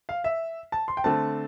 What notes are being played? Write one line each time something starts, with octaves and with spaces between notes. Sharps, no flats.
F5
E5
A5
C6
G5
D3 A3 C4 A5